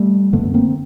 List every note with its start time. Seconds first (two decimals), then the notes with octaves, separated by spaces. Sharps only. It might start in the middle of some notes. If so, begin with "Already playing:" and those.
Already playing: G3 A3
0.33 F#2 D3 A3 B3
0.54 A#3 C4